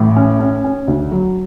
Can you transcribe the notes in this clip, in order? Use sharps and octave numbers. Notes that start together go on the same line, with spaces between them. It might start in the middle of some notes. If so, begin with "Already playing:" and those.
Already playing: A1 A2
C#4
C#4
C#4
D2
F#3